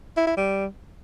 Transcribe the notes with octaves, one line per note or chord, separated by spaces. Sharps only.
E4
E4
G3